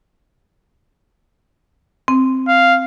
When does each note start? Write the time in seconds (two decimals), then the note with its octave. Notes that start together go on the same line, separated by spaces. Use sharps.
2.08 C4
2.48 F5